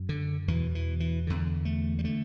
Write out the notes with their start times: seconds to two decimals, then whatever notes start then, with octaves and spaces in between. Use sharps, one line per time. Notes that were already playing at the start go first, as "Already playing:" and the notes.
Already playing: F#2
0.09 D3
0.48 E2 B2 E3
0.75 E3
1.00 E3
1.27 E2 D3
1.65 A3
1.99 G3
2.04 D3 A3